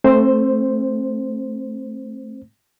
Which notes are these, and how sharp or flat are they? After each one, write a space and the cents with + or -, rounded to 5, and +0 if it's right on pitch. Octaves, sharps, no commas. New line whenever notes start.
A3 +0 C4 +25 C5 +0